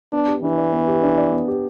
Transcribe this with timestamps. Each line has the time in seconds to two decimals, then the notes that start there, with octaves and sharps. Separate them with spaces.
0.13 B3 D4
0.27 G4
0.42 E3 D4
0.57 D5
0.73 B3
0.88 G4
1.03 D4
1.18 D5
1.32 B3
1.48 G4